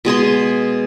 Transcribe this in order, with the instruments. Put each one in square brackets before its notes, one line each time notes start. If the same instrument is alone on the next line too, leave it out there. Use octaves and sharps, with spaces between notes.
[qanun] B2 G#3 G#4 C6